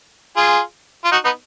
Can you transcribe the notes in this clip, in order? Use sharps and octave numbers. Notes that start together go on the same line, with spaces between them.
F4 G#4
F4
D#4 F#4
B3 D#4